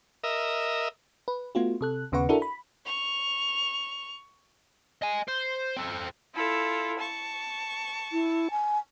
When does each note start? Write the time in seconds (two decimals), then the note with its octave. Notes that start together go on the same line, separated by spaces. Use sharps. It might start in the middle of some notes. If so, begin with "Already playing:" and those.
0.24 A#4 D#5 E5
1.28 B4
1.55 A3 B3 F4 F#4
1.81 C3 A4 F#6
2.12 D#2 C#3 B3 B4 F#5 C#6
2.29 D4 E4 F#4 A4 A#4
2.42 B5
2.85 C#6 F7
5.02 D#5 G#5
5.28 C5
5.76 C4 A4
6.36 E4 F4 A4
7.00 A5 C#6
8.12 E4
8.51 G#5